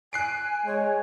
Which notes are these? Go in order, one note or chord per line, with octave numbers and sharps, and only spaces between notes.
G#5 F#6 C7 D7
G#3 C#5